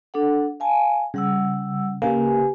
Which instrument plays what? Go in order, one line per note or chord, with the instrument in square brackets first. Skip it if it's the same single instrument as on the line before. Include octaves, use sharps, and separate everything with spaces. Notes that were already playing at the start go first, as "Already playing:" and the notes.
[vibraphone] D4 A4 F#5
F5 G#5 A5
[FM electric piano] C#3 [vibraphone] G3 F#5 E6
[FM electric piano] C#3 A#3 [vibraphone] G4 B4 G#5